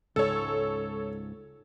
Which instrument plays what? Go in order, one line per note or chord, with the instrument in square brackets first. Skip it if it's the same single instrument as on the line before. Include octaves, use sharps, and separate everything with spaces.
[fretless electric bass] C#2 G#2 [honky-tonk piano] A4 C#5